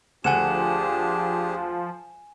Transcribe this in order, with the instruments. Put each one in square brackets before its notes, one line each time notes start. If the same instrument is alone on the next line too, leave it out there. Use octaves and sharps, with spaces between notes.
[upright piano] D2 F#5 [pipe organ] F3 [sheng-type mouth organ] D4 G4 G#4 [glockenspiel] G#5 E7